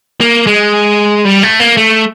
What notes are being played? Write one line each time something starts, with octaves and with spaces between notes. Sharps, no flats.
A#3
G#3
G3
A3
A#3
A3